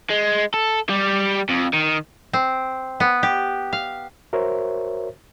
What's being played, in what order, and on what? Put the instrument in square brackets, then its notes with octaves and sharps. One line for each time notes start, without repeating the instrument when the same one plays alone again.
[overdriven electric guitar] G#3
A4
G3 G4
F2
D#3
[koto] C4
B3
G4
F5
[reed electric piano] F#4 A#4 C5 C#5 E5